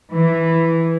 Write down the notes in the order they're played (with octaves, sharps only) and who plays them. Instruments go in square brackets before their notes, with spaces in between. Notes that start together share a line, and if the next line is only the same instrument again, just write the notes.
[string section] E3